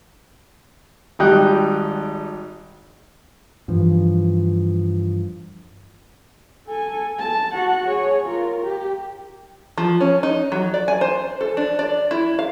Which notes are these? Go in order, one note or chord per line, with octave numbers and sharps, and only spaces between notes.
G#1 G3 D#4 G5 F#6
G2 E3 F3
A4 G#5
A5
F#4 F#5
G#4 C#5
F4 A#4
G4
F3
C#4
D#4
F#3
D5
G#5
C5
A4
D4
D5
E4
F5